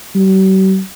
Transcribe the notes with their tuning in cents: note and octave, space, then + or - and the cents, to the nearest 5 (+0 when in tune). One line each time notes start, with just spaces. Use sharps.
G3 -45